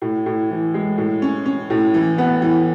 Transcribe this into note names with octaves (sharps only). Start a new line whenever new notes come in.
A2
A2
E3
G#3
A2
C#4
C#4
A2
E3
B3
E3